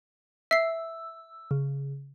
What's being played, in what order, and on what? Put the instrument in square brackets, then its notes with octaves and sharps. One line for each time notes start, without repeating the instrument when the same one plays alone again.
[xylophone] E5 C7 [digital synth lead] E6
[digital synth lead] C#3